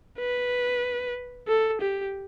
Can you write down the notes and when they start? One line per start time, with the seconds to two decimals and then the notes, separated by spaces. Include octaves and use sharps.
0.20 B4
1.48 A4
1.81 G4